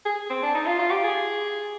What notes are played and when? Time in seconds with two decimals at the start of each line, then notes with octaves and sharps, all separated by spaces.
0.05 G#4
0.30 C4
0.43 D4
0.55 D#4
0.67 F4
0.79 F4
0.91 G4
1.04 G#4